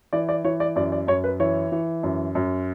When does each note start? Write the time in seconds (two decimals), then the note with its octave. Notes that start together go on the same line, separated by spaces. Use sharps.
0.13 E3 D5
0.29 D5
0.44 E3 C#5
0.60 D5
0.76 F#2 D5
0.92 D5
1.07 F#2 C#5
1.24 B4
1.40 E3 C#5
1.72 E3
2.03 F#2
2.35 F#2